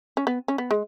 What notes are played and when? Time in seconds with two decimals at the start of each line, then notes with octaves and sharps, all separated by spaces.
0.17 C#4
0.27 B3
0.48 C#4
0.58 B3
0.71 G#3